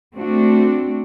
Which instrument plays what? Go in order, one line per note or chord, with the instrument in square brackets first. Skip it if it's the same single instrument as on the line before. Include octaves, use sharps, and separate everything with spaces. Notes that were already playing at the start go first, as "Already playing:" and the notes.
[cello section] A3 C4 D4 F#4